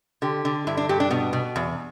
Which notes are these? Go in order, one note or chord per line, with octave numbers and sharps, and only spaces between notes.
D3 G4
D3
G2 E4
D4
G2 G4
D4
B2 B3
B2
E2